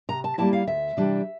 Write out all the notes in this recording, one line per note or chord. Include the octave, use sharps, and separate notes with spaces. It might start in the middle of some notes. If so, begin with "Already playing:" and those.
C3 A#5
A5
G3 A#3 E4 A5
F5
D2 E5
C3 E3 G3 D4